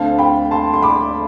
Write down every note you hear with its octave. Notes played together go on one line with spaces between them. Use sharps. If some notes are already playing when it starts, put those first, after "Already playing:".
Already playing: D2 D3 A3 C4 F5 A5
G5 B5
A5 C6
C6
B5 D6